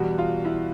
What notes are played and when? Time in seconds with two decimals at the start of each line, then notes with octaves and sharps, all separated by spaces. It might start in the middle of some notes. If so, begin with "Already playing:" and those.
Already playing: E2 B2 G3 F#4
0.18 F4
0.45 E4